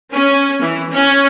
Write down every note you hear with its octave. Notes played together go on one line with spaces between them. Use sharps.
C#4
E3
C#4